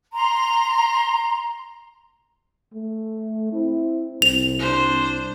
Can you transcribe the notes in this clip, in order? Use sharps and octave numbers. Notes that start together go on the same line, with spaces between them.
A#5 C6
A3
C4 E4
C2 C4 F7
D4 C5